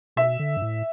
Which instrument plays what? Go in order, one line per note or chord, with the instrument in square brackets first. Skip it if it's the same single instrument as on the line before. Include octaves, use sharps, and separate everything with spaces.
[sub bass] B2 [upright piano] E5
[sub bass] D3
G2
A2